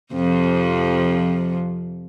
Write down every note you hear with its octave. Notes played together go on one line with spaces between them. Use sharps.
F2 C3 F3